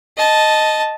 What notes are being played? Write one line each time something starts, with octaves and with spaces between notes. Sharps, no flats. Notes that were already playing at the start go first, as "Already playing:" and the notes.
D#5 A5